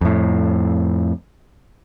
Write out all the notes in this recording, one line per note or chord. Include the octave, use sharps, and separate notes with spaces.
F2 A2